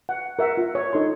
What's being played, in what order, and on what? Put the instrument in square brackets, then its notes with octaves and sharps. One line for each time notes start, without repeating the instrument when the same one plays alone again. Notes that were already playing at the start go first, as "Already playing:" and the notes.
[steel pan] F#5
A#4 E5 F#5
F4
C#5
D#4 A4 C6